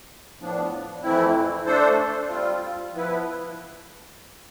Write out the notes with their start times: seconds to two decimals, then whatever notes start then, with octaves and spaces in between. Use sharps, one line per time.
0.39 A2 F3 B3 D4
1.03 F2 E3 A3 C4 E4
1.66 A3 D4 A4 C5
2.30 G3 C4 F4
2.93 F3 B3 E4 B4